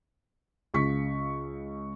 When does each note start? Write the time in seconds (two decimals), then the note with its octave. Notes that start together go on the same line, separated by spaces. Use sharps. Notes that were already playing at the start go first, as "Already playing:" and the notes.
0.74 C#2 C#3 C#6 B6